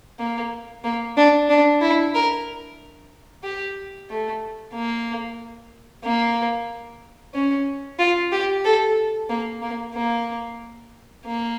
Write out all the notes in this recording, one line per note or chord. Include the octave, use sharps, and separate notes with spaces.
A#3
A#3
D4
D4
E4
A#4
G4
A3
A#3
A#3
C#4
F4
G4
A4
A#3
A#3
A#3
A#3